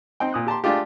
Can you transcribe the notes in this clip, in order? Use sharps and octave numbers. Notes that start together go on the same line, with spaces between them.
C4 D#4 G5
A#2 D#6 F#6
G4 A5 A#5 C6
G#3 A3 D4 F4 G4